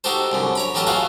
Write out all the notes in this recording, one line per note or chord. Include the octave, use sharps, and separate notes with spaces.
D#4 F#4 G4 A4 C5
C2 F#2 D3
C#5 A#5 B5
A1 F#3 G4 A4 A#4 A5
A3 F4 F#4 G#4 B4 F5